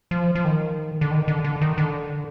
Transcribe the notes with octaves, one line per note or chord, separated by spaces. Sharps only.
F3
F3
D#3
D3
D#3
D3
D3
D#3
D3